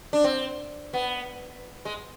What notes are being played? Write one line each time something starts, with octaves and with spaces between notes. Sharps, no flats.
D4
C4
B3
G#3